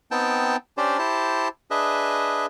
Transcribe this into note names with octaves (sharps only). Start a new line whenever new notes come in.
B3 C4 D#4 G5 A5
C#4 D4 G4 C5 D5
E4 G4 C5 A5
D4 G#4 B4 D#5 E5